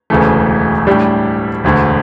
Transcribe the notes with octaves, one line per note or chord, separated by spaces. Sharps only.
E1 D2 C#3 E3 A3
A2 G3 D4 G4
E1 D2 D3